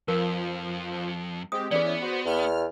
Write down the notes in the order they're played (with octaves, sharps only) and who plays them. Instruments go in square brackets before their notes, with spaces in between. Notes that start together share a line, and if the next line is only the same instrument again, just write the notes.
[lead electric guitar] F2 [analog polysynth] F3 [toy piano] A#4
[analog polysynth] G#3 C4 G4 [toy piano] D#6
[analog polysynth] E3 C#4 [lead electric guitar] B3 [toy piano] G#4 D5
[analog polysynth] F#4 C5
[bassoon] E2 [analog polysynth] F6